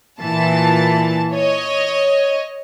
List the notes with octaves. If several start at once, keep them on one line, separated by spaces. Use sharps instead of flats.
A#2 E3 A5
C#5 D#5